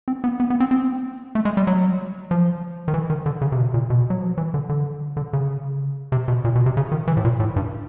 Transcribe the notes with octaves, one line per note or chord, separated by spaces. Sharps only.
C4
B3
B3
B3
C4
C4
A3
G#3
G3
F#3
F3
D#3
E3
D#3
D3
C#3
C3
B2
A#2
B2
F#3
F3
E3
D3
D3
D3
C#3
C3
B2
A#2
B2
C3
C#3
D#3
E3
A2
A#2
A2
G2